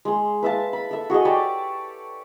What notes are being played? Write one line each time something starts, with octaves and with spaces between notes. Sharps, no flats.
G#3 C6
B4 E5 F5 A5
B5
A4 E5
F#4 G#4 A4 D#5
G4 C#5 D5 A5